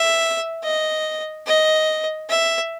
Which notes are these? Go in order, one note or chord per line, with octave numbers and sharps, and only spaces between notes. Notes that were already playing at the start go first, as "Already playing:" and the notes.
Already playing: E5
D#5
D#5
E5